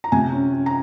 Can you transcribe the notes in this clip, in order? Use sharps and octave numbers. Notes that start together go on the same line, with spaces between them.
A#5
C3 G#5
C#4
C#4
A#5